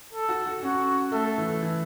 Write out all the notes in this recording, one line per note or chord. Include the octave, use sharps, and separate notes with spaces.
A4
F#4
F#4
C#4 F#4
A3 A4
E3
E3